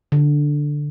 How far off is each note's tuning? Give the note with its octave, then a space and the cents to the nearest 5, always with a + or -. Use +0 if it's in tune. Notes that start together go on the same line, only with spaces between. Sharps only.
D3 +0